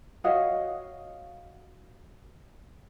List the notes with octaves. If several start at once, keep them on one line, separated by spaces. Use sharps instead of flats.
F#4 C#5 D#5 F5